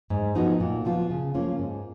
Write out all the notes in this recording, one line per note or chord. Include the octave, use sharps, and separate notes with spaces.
G#2
F3 B3 D#4 F#4
A#2
F3 B3 F4
C#3
F3 A#3 C#4 F4
G#2